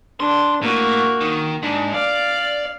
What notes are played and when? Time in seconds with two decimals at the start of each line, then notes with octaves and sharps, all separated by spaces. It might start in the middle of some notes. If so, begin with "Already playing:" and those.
0.20 D4 C6
0.62 A2 A#3 F#4
1.21 D#3
1.62 G#2 D4
1.93 D5 F5